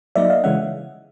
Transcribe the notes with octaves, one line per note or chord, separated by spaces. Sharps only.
F#3 A#3 D#4 D5 E5
D#5 F5
C#3 E3 G#3 C#4 E5 F#5